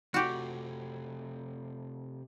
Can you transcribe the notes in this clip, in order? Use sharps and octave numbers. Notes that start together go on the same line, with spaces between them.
C3 A3 F#4 G4